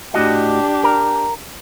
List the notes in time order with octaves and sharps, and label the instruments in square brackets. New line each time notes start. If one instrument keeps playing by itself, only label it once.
[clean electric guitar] A2 F#4 D#5 [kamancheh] D4 G4
[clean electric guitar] A#4